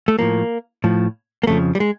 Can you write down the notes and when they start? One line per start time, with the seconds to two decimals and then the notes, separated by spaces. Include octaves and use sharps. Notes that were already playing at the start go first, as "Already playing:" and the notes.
0.08 A3
0.19 A2 F3 A#3
0.84 A2 F3
1.43 A#3
1.47 F2 C#3 F3 A3
1.75 G3
1.80 G#3